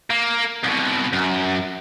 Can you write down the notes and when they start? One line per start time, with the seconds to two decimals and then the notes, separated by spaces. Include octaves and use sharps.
0.10 A#3
0.63 C2 B2
1.13 F#2